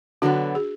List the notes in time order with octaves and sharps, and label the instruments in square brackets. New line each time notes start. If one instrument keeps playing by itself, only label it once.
[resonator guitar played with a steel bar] D3 F#3 B3 [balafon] D4 F#4
[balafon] G#4